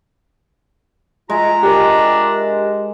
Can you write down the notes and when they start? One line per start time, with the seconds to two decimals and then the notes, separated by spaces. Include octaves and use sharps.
1.30 G#3 F4 E5 A#5
1.63 D4 G4 A#4